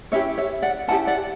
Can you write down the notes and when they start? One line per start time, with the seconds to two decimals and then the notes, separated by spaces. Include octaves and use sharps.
0.12 C#4 E4 G4 C#5 E5
0.38 C#5 E5
0.62 D5 F#5
0.88 C#4 E4 G4 F#5 A5
1.07 D5 F#5